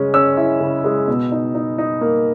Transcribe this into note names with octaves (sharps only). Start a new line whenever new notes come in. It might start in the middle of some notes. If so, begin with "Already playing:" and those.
Already playing: C#3 G#3 C#4
C#4 E6
E4
C#3
G#3
B2
D#4
D#4
D#4
A#3